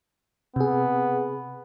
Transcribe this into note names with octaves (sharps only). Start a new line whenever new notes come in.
C3 B3 G#4